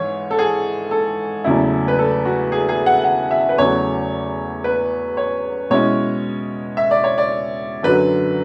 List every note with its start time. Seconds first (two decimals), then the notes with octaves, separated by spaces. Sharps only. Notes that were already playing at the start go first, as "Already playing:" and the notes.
Already playing: G#2 E3 G#3 C#5
0.31 A4
0.39 G#4
0.91 A4
1.44 E2 C#3 F#3 A3 E4
1.88 B4
1.99 A4
2.25 F#4
2.52 G#4
2.69 G#4
2.86 F#5
3.04 F#5
3.31 E5
3.49 B4
3.58 E2 C#3 F#3 A3 C#5
4.64 B4
5.17 C#5
5.70 B2 G#3 C#4 E4 C#5
6.77 E5
6.91 D5
7.04 C#5
7.18 D5
7.83 F#2 D3 F#3 B4